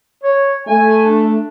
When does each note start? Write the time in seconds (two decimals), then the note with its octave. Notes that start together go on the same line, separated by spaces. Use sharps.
0.24 C#5
0.67 A3 G#5
1.04 D4